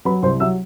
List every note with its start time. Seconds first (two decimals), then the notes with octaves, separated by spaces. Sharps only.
0.05 F#3 B4 B5
0.23 C2 C5 C6
0.40 F#3 E5 E6